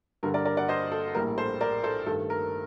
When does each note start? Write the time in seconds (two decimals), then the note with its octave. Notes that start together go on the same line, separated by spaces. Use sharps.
0.23 G2 D3 G3 A#4
0.34 A#4 D5
0.45 A#4 D5
0.57 D5 F#5
0.68 C5 D#5
0.92 A4
1.15 A#1 A2 G3 A#3 A#4
1.38 A4 C5
1.61 A#4 D5
1.84 A4 C5
2.06 G2 D#3 A3 A4
2.30 A#4